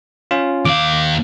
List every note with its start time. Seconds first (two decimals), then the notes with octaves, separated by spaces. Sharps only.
0.31 C#4 F4
0.65 D#2 F5 D6